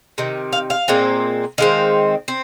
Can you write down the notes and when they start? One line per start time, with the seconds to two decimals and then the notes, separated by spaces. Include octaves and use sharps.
0.18 C3 D#3
0.53 F5
0.70 F5
0.88 A#2 G#3 C4
1.58 D#3 G#3 C4 F5
2.28 C4